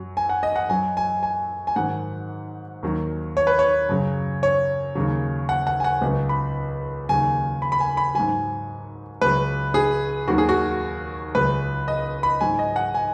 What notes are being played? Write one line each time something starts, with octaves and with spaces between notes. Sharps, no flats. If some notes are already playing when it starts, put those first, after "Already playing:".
Already playing: F#2 F#3
G#5
F#5
D#5
F#5
F#2 F#3 G#5
G#5
G#5
G#5
G#2 D#3 F#3 F#5
D#2 D#3 F#3
C#5
B4
C#5
F#2 C#3 F#3
C#5
D#2 C#3 F#3
F#5
F#5
G#5
F#5
C#2 C#3 F#3
B5
D#2 C#3 F#3 G#5
B5
B5
G#5
B5
G#2 F#3 G#5
C#2 C#3 F#3 B4
G#4
D#2 D#3 F#3 F#4
G#4
F#4
C#2 C#3 F#3 B4
D#5
B5
G#2 F#3 G#5
D#5
F#5
G#5